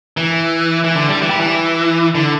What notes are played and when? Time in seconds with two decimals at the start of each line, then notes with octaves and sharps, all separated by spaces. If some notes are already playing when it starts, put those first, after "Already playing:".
0.17 E3
0.84 E3
0.95 D3
1.09 G3
1.22 E3
1.30 G3
1.40 E3
2.15 D3